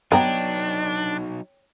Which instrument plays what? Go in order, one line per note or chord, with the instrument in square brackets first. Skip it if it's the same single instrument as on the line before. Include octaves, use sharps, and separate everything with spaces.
[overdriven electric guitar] F#3 D#4 [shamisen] B3 A#5 [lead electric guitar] D4 [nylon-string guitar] C#5 G5